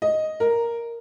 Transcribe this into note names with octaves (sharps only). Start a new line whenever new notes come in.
D#5
A#4